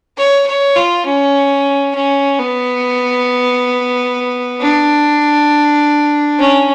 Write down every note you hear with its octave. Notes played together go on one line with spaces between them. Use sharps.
C#5
C#5
F4
C#4
C#4
B3
D4
C#4